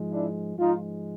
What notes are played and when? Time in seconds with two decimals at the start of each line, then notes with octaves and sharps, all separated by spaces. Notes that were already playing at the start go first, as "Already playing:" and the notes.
Already playing: G#2 F3 G#3
0.11 D4 E4
0.58 G#2 F3 G#3 D#4 F4